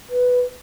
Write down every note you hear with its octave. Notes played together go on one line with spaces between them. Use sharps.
B4